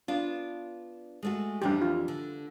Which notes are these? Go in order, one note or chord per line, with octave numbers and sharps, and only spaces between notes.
B3 D4 F4
G#3 A3 F#4
F2 E3 G3 D4 G4
F4
D3